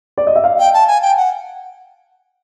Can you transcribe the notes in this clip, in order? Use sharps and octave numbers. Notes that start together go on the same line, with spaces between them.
D5
D#5
E5
F5
G5
A5
G#5
G5
F#5